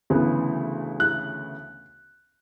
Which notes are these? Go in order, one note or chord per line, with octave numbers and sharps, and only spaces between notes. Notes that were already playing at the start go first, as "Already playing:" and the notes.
D2 C#3 E3 B3
F#6